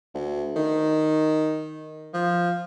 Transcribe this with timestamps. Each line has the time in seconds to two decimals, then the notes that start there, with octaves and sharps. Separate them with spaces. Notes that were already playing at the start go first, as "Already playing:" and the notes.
0.14 D2
0.56 D#3
2.13 F3